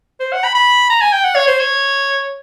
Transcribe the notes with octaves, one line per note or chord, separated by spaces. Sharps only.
C5
F#5
B5
B5
A#5
G#5
G5
F#5
C#5
C5
C#5